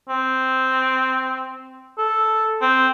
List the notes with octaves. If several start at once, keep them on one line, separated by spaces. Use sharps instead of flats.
C4
A4
C4